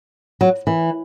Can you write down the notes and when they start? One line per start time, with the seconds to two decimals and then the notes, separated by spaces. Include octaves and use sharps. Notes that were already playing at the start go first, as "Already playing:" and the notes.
0.41 F#3
0.67 E3